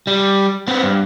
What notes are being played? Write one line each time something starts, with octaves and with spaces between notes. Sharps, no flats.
G3
B3 C4
G2